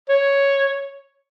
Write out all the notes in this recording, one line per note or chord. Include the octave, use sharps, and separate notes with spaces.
C#5